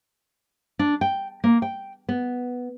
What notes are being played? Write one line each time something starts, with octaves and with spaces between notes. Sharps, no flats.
D4
G5
A#3
G5
B3